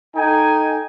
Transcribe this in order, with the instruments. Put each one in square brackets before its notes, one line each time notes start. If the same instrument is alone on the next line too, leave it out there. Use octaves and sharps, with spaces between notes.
[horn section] D#4 A4 G5 G#5